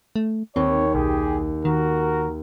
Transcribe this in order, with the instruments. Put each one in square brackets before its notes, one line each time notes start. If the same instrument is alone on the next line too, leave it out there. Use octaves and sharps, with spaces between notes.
[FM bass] A3
[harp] D#2 [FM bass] C4 [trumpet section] C#5
[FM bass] B1 [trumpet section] G4 G#4
[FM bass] D#3 [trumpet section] F#4 A#4